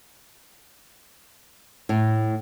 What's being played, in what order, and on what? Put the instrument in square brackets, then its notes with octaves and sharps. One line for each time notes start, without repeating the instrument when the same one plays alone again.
[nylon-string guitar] A2